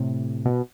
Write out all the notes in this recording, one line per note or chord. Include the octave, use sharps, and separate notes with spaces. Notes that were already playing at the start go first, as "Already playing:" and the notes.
Already playing: A2 C3
B2